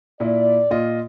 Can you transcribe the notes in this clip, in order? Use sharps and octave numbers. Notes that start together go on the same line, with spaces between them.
A#2 E4 D5
A#2 F4 D#5